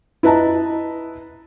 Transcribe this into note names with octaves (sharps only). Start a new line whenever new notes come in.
E4 B4 D#5 A5 A#5